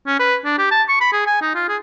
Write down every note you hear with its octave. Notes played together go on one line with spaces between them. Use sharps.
C#4
B4
D4
G4
A5
C#6
B5
G#4
G#5
D#4
F4
G#4